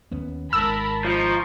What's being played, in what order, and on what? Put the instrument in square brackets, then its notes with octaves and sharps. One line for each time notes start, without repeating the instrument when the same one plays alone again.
[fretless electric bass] D#2 B3 C#4
[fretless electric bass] G#1 G#2 [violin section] A#4 A5 B5 [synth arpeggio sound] E6
[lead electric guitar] F3 [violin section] D#4 C#6